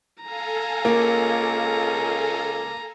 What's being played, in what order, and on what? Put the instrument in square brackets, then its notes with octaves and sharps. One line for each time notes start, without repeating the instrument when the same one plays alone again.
[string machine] A4 F5 G#5 [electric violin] A#5
[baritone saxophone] C#2 [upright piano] A#3